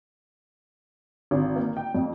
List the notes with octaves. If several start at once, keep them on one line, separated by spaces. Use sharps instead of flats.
G#1
A#3
G5
F2